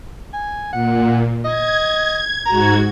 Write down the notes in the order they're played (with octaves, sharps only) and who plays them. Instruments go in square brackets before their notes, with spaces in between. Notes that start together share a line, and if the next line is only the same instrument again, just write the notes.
[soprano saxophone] G#5
[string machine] A#2 [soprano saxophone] F#5
[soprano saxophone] D#5 [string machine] G#6
[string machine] G#2 F#4 G#6 [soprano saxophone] A#5